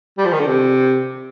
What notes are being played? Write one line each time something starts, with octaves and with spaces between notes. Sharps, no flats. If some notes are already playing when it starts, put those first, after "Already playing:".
G3
F3
D#3
D3
C3